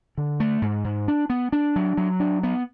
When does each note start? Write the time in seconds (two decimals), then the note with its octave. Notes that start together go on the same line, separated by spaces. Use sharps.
0.18 D3
0.40 A3
0.62 G#2
0.84 G#2
1.08 D4
1.30 B3
1.52 D4
1.76 F#3
1.97 F#3
2.20 D4
2.43 B3